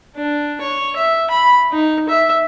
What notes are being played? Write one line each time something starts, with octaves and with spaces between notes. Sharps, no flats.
D4
C#5
E5
B5
D#4
E5